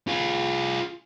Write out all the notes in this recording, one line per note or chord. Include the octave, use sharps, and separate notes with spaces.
F4 G#4